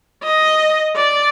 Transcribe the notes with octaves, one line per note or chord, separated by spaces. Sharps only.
D#5
D5